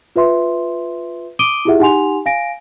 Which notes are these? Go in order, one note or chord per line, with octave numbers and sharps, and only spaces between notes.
F4 B4 E5 C6
D6 D#6 D7 D#7 G7
E4 F4 G4 G#4 E5 F#5
D#4 G4 F#5 G#5 C6 F7
F5 G#5 A#6 D7